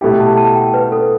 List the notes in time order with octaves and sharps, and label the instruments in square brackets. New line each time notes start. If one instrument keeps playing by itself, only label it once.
[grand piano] B2 A3 E4 G4 [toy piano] G5
[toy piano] A5
A5
G5
B4
A4